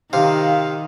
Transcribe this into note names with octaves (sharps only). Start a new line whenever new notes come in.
C3 D#3 F5